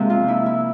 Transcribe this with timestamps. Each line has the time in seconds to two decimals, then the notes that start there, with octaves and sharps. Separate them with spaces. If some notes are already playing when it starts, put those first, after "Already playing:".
Already playing: C3 F3 G#3 A#3
0.10 F4
0.28 E4
0.46 E4